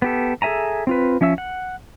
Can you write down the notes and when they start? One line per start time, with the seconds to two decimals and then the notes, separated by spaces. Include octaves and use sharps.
0.02 B3 G4 A4
0.42 G#4 A4 E5 G#5 A#5
0.87 C4 F4 B4
1.21 F3 C#4 E5 E6
1.38 F#5